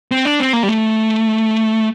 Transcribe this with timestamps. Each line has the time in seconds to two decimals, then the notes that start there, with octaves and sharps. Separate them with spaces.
0.11 C4
0.25 D4
0.40 C4
0.53 A#3
0.63 G3
0.68 A3